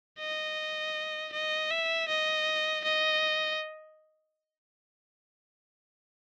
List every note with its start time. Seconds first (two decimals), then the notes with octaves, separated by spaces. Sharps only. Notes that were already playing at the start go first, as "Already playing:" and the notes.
0.20 D#5
1.33 D#5
1.71 E5
2.08 D#5
2.84 D#5